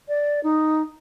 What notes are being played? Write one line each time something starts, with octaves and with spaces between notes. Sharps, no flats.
D5
D#4